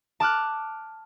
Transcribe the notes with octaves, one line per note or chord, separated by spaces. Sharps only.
A5 D6 F6 F#6